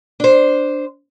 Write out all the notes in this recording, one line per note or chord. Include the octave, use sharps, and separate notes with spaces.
D4 C5